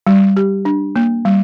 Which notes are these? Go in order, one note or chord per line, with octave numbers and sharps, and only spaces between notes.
G3
G4
D4
A#3
G3